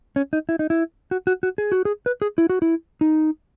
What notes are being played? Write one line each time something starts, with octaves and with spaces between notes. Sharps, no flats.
C#4
D#4
E4
D#4
E4
F#4
F#4
F#4
G#4
F#4
G#4
B4
G#4
E4
F#4
E4
D#4